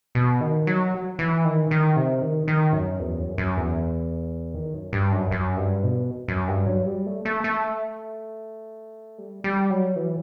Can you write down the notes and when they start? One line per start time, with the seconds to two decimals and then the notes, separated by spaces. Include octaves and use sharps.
0.15 B2
0.41 D#3
0.67 F#3
1.19 E3
1.45 D#3
1.71 D#3
1.96 C3
2.22 D#3
2.48 D#3
2.73 F#2
3.00 E2
3.19 F#2
3.38 F#2
3.57 E2
4.54 D#3
4.74 F#2
4.93 G2
5.12 F#2
5.31 F#2
5.57 G2
5.84 B2
6.28 F#2
6.48 G2
6.66 F#3
6.86 G3
7.06 A3
7.25 A3
7.44 A3
9.18 G3
9.44 G3
9.70 F#3
9.96 E3